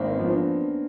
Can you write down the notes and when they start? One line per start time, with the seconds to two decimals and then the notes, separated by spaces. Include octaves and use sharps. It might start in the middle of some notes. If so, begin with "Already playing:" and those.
Already playing: G#1 A#3 C4
0.10 B3 C#4
0.20 F3
0.28 C4 D4